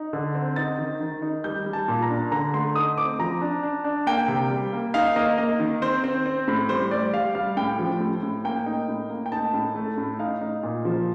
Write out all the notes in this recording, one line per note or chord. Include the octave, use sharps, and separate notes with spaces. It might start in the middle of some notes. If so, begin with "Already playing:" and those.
Already playing: D#4
D3
C4
D#4 A6
D#3
D#3
D#4
G3 G6
G3
A5
A#2
A#5
D4
D3 A#5
A3 C6
D#4 D#6
C4 D6
F3 A#5
D4
D4
D4
A#3 G5
C3
G3
A#3
D#4 F5
A#3 D#5
A#3 D#5
D#3
C4 C5
C4
C4
A2
G3 C5
G3 D5
G3 F5
G3 F5
A2 G5
F3
A2
A2
A#3 G5
D#4
A2
A#3
G5
D#4 A5
A2
A3
A2
D#4 F5
D#4
A#2
F3